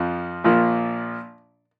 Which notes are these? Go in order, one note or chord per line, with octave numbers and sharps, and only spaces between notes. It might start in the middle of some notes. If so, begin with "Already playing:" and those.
Already playing: F2 F3
A#1 A#2 F3